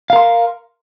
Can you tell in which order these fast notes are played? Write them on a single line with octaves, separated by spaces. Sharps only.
F5 A#4 C6